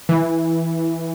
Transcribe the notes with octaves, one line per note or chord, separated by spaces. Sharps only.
E3